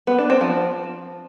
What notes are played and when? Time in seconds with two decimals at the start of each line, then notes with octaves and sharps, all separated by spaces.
0.07 B3
0.18 D4
0.30 C4
0.41 F3